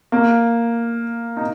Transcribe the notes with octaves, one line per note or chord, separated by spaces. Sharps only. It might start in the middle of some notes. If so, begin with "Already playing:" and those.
A#3
D#4